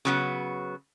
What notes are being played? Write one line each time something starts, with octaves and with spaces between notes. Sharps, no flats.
C#3 F#3 B3